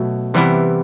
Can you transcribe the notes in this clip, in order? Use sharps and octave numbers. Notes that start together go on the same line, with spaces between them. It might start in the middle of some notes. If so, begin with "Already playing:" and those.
Already playing: B2 F#3 A3
C3 E3 G3 B3 E4